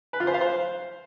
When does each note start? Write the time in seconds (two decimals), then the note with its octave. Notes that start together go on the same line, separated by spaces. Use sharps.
0.13 B4
0.20 F4
0.27 C5
0.34 F5
0.41 C5